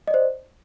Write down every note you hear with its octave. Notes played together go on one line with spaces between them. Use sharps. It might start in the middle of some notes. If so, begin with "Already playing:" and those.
C5 D5 D#5